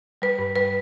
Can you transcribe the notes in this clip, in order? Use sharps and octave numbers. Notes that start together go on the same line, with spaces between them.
G3 B4
G2
G3 B4